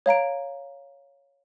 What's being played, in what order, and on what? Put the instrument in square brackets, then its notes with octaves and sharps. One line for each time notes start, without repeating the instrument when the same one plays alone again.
[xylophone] C#5 F5 A#5 D7